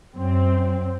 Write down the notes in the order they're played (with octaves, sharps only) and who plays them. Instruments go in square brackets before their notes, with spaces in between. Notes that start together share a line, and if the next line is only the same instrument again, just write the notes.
[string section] F#2 C4